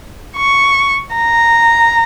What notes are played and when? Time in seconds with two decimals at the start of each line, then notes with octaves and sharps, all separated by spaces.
0.36 C#6
1.16 A#5